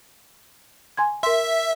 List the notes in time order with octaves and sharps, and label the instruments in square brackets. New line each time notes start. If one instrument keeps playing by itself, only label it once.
[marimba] G#5 C6 G#6
[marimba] A#4 C6 [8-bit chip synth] E5